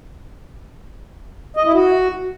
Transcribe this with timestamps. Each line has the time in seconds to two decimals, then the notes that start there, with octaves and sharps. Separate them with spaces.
1.57 D#5
1.65 E4
1.74 F#4